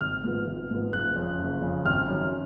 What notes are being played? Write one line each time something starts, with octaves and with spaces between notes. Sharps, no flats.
G#1 F6
G#2 F3 B3
G#1
G#2 F3 B3
F#1 F#6
F2 C#3
F#1
F2 C#3
G#1 F6
F#2 D#3